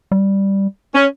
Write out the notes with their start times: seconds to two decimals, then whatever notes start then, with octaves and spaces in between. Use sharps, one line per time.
0.12 G3
0.95 C#4